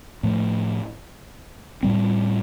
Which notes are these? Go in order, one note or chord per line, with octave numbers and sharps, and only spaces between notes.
A2 F3 A3
A2 G3 C4